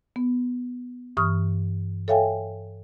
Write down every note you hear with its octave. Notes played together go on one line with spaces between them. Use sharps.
B3
G2 E3 C#6 D#6 F6
A4 C#5 E5 F5 G5 G#5